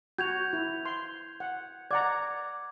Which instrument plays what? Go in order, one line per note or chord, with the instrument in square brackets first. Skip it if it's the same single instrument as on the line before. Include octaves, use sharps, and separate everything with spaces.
[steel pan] F#4 [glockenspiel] G6 G#6 F7
[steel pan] E4
C6
F#5
[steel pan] D5 F#5 A#5 [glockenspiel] D6 G#6